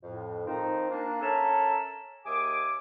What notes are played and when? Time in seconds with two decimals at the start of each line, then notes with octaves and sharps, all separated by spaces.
0.02 F2 A2
0.47 D#3 F3 C4 D#4
0.90 A#3 D4
1.21 C#4 A4 A#4 E5 G#5 A5
2.26 D#2 G#4 E5 G#5 D6